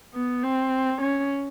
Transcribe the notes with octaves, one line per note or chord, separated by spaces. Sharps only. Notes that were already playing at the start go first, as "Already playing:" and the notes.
B3
C4
C#4